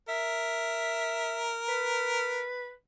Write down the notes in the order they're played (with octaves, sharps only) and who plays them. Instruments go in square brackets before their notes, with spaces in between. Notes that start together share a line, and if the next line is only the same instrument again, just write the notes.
[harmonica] A#4 [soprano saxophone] E5
[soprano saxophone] B4